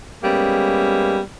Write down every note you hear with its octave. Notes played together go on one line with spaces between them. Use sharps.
G3 G#3 A#3 B3 C#4